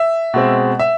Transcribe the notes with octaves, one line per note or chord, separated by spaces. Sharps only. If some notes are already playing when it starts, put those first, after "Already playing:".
Already playing: E5
B2 G#3 C4
E5